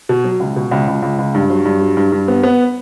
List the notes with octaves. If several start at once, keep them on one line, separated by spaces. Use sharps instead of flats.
B2
F#3
C#2
B2
C#2
C#2
C#2
C#2
G2
F#3
G2
F#3
G2
G2
B3
B3